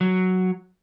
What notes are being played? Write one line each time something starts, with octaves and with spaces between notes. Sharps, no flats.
F#3